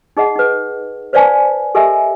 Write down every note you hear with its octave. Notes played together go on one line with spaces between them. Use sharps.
D#4 G#4 D#5 F#5
D#4 B4
B4 C5 D5 F5 G#5 A5
G4 A4 A#4 D#5 E5 G#5